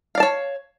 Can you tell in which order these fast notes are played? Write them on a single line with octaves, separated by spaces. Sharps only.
F5 D5 A5 C#5